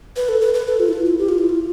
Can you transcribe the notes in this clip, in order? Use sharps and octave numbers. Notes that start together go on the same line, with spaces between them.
B4
A4
B4
B4
A4
F4
E4
F4
E4
G4
F4
E4
F4